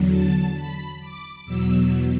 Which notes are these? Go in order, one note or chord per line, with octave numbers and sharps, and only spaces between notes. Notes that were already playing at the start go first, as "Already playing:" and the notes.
Already playing: E2 D3 F#3
A5
B5
D6
E2 B2 F#3 E6